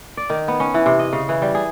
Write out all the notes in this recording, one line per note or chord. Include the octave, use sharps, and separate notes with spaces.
D5
D#3
B3
C#4
E3
C3
D#5
C#3
E3
G3
G#4